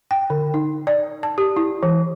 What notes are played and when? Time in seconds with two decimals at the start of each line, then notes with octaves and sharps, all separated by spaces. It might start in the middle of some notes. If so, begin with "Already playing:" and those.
0.11 G5
0.30 D3
0.54 D#4
0.87 D5
1.23 A5
1.38 G4
1.56 E4
1.83 E3